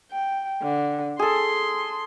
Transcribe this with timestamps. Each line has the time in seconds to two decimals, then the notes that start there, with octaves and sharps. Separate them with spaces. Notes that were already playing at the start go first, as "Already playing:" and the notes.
0.11 G5
0.62 D3
1.19 G#4 A4 C6